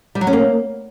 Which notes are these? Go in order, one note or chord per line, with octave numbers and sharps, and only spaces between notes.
G3
F#3
C#4
A#3